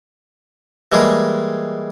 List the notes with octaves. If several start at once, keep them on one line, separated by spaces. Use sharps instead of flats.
E3 G3 G#3 A#3 G#4